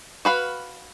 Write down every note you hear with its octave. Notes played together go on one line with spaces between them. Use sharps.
F#4 B4 F5